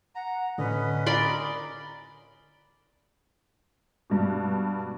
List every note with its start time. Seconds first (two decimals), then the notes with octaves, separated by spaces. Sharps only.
0.15 F#5 A#5
0.58 A2 D3 C#4 B4 D#5
1.06 A#4 D5 B5 C6
4.10 G2 B2